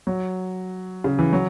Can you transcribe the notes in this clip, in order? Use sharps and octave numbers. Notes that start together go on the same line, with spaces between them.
F#3
C#3
E3
F#3